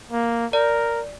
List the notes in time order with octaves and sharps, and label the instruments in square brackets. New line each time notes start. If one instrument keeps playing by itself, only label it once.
[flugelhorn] A#3
[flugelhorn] A#4 [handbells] D5